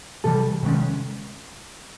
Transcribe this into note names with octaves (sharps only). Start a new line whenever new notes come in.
C3 E3 G3 A4
C3 D#3 G#3 C#4